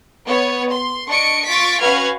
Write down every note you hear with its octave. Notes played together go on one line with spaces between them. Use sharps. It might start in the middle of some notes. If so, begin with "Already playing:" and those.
B3 C#5
C6
D4 D#5 C#6 C#7 D7
F4 C#6 A6 B6 D7
C#4 F#4 B4 F5 F6 G#6